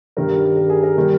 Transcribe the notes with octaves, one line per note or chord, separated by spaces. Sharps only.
G2 D#3 G3 A#4
A#4
G#4
A#4
D#3 G3